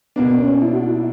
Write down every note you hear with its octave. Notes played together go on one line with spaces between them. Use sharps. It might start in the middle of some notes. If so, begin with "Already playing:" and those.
B2 A#3 B3 D4
C#4
E4
F#4
E4
E4